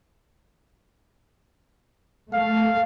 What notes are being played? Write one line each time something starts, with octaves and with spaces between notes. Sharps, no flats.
A3 F5